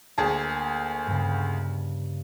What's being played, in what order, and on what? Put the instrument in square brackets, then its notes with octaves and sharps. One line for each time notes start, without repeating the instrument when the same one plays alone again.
[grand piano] D2 G#4 A5 [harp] A#3
[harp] G2 C#3